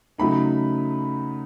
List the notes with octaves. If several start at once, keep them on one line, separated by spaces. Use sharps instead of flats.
C#3 F#3 A3 D#4 B5